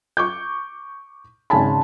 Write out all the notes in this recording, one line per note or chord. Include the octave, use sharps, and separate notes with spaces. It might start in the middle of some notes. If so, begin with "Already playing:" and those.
C#6 D6 G6
G#1 C#3 D#4 G#5 A5 B5